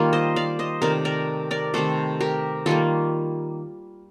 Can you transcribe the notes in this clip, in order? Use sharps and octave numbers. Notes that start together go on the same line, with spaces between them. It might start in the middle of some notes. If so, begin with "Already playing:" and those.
Already playing: D#3 G3 A#3 F4
C5 D#5
D5 F5
C5 D#5
C3 D#3 A3 A#4 D5
A#4 D5
A#4 D5
C3 D#3 A3 A4 C5
G4 A#4
D#3 G3 A#3 F4 A4